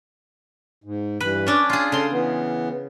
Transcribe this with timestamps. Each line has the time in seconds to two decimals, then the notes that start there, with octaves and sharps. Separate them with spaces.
0.84 G#2
1.21 G2 E3 B4
1.47 C#4 D4 C#5 D5
1.70 F4 G#4
1.92 C#3 A4 C6
2.11 E3 B3